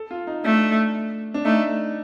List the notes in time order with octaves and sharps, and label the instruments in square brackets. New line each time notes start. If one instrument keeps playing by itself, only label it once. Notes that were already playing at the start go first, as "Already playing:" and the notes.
Already playing: [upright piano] A4
F4
D#4
[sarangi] A3 [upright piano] D4
[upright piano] D4
[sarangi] A3 [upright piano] D#4